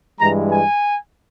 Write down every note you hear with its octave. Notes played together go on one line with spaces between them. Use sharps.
G2 E3 G#3 A#5
G#5